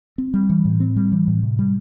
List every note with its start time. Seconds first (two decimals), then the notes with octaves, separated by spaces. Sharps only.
0.18 C4
0.34 G3
0.49 E3
0.65 A2
0.80 C4
0.96 G3
1.12 E3
1.27 A2
1.43 C3
1.59 G3